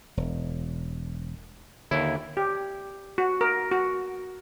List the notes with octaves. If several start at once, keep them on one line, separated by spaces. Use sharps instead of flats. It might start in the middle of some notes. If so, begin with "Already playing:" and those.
E1
D#2 D3 E4
G4
F#4
A#4
F#4